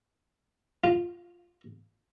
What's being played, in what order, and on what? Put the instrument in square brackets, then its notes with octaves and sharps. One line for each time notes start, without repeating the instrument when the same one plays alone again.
[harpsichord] F4